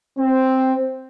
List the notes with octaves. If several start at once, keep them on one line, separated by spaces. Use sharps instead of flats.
C4